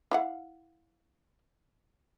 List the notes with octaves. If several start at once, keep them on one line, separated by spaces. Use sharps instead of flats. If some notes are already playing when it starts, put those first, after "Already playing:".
E4 F5 F#5